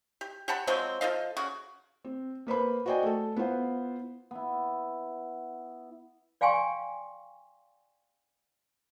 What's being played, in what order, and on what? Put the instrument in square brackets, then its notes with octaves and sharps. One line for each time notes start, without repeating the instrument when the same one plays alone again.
[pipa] G4
G4 F#5 A5 B5
F3 F#3 G#3 C4
F3 A4 D#5 F5
C#3 F#4
[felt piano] C4
A#3 B4 C5 B5
F#4 C5 D5 D#5 G5 G#5
A3 A4
B3 E4 F4 C5 F#5
[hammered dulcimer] B3 E4
[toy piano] D5 F5 G5 G#5 C6 C#6